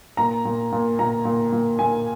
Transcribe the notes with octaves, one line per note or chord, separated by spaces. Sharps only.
A#2 A#5
A#2
A#2
A#2 A#5
A#2
A#2
A#2 G#5